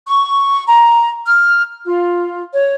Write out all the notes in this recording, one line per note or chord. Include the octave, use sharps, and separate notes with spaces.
C#6
A#5
F6
F4
C#5